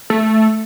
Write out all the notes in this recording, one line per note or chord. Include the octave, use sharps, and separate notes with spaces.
A3